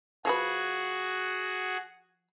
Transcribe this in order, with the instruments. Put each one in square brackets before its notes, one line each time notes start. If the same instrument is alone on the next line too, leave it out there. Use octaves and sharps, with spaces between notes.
[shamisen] F3 A4 B4 [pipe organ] F#4 G#4